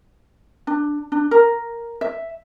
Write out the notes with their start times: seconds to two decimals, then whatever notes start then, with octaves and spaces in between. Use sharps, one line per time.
0.67 D4
1.12 D4
1.31 A#4
2.01 E5